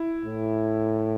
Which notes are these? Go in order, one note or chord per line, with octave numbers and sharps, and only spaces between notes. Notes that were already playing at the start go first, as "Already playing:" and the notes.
Already playing: E4
A2